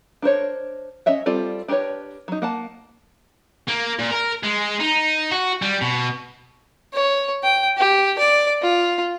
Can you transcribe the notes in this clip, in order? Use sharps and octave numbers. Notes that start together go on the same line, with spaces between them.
D4 A#4 C5 C#5
C#4 C#5 D#5 E5 F#5
G3 C4 F4 A4 D5
D4 G4 A#4 B4 C#5
F#3 D#4
A#3 F#5 A5
A#3
A#2
A#4
G#3
D#4
F#4
G3
B2
C#5
G5
G4
D5
F4